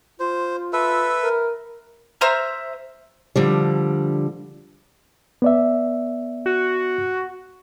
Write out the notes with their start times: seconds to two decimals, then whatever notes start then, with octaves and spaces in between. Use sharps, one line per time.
0.20 F4 C5
0.73 A4 B4 E5
1.23 A#4
2.21 C5 E5 A#5 F6
3.36 D3 F3 G3
5.42 B3 D5 E5
6.46 F#4